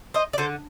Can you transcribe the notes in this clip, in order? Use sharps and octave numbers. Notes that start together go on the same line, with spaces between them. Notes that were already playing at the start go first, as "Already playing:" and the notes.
C5 D#5
D5
D3 A4 C5